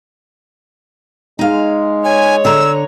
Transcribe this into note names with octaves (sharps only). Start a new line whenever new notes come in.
G#3 D#4 F5
C#5 G#5
D3 A#5 E6